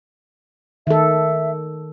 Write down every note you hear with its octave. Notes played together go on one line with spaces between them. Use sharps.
D#3 A4 E5